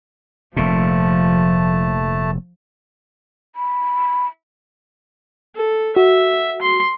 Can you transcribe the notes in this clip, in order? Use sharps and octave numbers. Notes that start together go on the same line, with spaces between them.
F1 A#2 F3 A3 A5
B5
A4
F#4 E5
C6